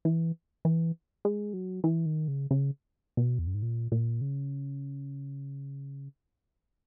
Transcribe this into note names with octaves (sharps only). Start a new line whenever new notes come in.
E3
E3
G#3
F#3
E3
D#3
C#3
C#3
B2
E2
F#2
G#2
A#2
A#2
C#3